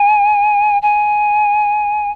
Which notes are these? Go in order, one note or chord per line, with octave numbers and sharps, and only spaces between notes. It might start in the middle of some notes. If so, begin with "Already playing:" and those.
Already playing: G#5
G#5